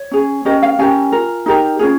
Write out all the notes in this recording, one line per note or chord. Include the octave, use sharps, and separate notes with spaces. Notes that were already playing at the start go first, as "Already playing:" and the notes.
Already playing: C#5
C#4 G#4
C#4 G4 A#4 D#5
F5
C#4 G4 A#4 G#5
F4 A#4
D#4 G4 A#4
C#4 F4 G#4